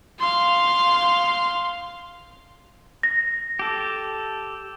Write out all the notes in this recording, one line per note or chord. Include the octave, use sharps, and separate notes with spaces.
F5 C6
A#6
G4 A4